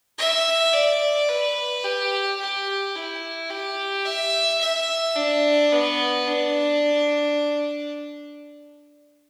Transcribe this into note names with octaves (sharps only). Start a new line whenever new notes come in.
E5
D5
B4
G4
G4
E4
G4
E5
E5
D4
B3
D4